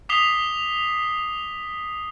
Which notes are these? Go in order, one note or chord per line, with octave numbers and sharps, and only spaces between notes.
D6 D#6 B6 C7 F7 G7